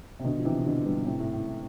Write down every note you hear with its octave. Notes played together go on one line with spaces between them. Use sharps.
C3
B2 D3
F3
C3 E3
B2 D3
G2 B2
A2 C3
A2
A2